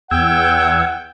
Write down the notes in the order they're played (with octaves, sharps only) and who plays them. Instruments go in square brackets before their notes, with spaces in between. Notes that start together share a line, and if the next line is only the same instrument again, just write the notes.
[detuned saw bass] E2 [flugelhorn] F#5 [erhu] G5 [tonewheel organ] E6 G#6